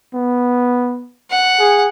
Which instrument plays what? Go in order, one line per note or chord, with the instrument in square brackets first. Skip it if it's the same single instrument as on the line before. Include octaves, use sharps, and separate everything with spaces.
[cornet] B3
[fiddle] F#5
[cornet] G#4